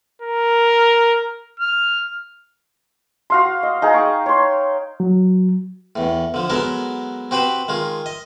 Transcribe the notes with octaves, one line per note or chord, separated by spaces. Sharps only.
A#4
F6
F#4 F5 C6
D#5
D#4 G#4 F5 A#5
G5 C#6
C#5 C6
F#3
E2 A2
D3 F3
F#3 G#3 B3 A4 A#4
C4 F#4 G4 B4 C5 B5
D#3 G#3 F4
D#5